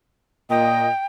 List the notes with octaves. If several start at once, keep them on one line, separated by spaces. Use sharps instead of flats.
A#2 D#5 G5